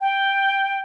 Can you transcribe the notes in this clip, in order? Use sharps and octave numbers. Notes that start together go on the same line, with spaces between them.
G5